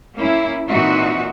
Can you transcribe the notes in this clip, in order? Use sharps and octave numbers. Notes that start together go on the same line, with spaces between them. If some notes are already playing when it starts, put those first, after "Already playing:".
A#3 C#4 E4
A#2 E3 C4 D#4 F#4 E5